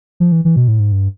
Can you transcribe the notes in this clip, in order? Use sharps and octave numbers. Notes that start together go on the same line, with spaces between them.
F3
E3
E3
B2
A2
G#2
G2